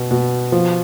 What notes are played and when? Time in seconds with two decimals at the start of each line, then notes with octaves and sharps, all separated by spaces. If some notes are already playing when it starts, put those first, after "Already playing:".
Already playing: B2
0.11 B2
0.52 F3